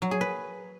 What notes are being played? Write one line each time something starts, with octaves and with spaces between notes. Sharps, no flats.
F#3
G#4
B4